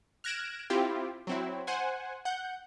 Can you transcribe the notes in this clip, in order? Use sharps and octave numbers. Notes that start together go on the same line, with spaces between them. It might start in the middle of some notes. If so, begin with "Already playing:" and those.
F6 F#6 G#6 A#6 D7 E7
C4 E4 F4 G4
F#3 C4 E4
C5 F#5 G#5
F#5 G6